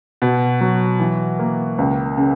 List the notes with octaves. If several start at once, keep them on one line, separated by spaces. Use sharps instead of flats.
B2
F#3
E3
A#3
C#2
C#3